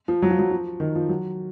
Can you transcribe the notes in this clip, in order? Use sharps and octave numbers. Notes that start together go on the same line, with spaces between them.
F3
F#3
F3
F#3
F3
D#3
F3
F#3